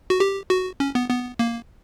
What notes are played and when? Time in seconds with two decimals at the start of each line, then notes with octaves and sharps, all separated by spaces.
0.10 F#4
0.20 G4
0.50 F#4
0.80 C#4
0.95 B3
1.10 B3
1.39 A#3